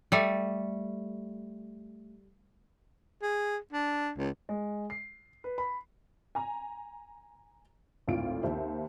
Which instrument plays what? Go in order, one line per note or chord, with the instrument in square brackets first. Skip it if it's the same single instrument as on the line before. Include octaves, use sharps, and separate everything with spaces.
[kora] G3 A3
[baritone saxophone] G#4
D4
C#2
[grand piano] G#3
C7
B4
B5
[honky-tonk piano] G#5 A#5
G#1 D2 A2 F4 D7
D#2 C5 E5